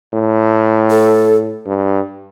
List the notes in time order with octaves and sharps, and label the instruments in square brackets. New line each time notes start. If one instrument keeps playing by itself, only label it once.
[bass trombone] A2
[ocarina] A4
[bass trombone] G2